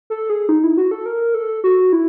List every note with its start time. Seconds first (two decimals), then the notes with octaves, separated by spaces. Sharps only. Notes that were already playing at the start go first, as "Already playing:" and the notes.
0.10 A4
0.30 G#4
0.49 D#4
0.64 E4
0.77 F#4
0.91 A4
1.06 A#4
1.34 A4
1.64 F#4
1.93 E4